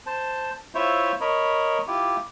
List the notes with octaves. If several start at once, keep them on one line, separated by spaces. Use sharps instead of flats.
C5 A5
E4 F4 C5 C#5 E5
A#4 C#5 D#5 B5
E4 F4 G4